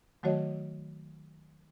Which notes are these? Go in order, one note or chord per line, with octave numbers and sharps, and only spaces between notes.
D#3 F#3 A3 F#4 C#5 D#5